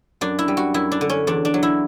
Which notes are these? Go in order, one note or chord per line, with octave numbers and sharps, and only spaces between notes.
F#2 D4
E4
G3
F#4
F#2 E4
D4
D3
C#4
E2 D4
D4
F#3
E4